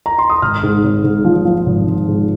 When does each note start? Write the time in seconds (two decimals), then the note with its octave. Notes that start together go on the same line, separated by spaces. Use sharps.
0.06 A#5
0.19 C6
0.30 D#6
0.42 G#1 F6
0.63 G#2
0.84 G#1
1.04 G#2
1.25 F3
1.45 F3
1.66 G#1
1.87 G#1
2.08 G#2